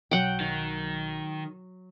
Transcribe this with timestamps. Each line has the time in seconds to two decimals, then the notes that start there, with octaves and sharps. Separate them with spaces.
0.11 B1 F#3 F#5 G5
0.40 D#3